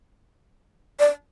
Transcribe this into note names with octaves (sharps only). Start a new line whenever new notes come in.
D5